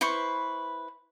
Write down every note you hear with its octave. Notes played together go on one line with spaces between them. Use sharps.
E4 B4 C5 C#6